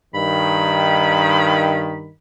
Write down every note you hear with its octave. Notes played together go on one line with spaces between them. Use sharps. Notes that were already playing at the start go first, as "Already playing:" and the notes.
G2 D#3 B5